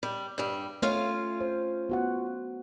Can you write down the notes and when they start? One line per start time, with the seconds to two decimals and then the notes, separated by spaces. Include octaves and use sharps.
0.03 G3
0.38 G2 G3
0.82 A3 C#4 F4 F5
1.40 C5
1.89 B3 F#4 F#5